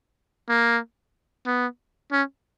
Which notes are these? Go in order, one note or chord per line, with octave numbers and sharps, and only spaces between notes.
A#3
B3
C#4